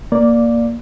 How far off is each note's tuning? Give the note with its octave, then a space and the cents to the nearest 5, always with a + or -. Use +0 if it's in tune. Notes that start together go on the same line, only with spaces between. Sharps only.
A#3 +0 D5 +0